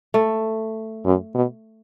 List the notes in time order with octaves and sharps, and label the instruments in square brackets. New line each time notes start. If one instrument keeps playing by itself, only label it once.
[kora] A3
[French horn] F#2
B2